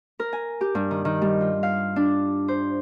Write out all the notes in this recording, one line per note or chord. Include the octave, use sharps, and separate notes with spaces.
A#4
G#5
G4
G2
D#3
D#3
G3
F4
F5
D4
C5